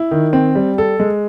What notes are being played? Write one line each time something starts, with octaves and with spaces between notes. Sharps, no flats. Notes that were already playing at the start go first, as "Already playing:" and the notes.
Already playing: E4
D#3
C4
G3
A4
G#3